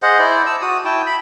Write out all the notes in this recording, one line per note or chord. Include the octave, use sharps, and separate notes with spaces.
G#4 C5 D#5 F#5
E4 C5 D5
A5 E6
F#4 D#6
E4 G5 A5
B5